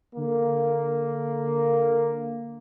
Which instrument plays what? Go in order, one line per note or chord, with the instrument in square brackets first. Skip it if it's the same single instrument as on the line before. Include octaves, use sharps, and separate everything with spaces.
[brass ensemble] D3 A#3